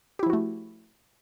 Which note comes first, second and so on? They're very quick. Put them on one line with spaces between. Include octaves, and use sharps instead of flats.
G4 E4 F3 F#4 A3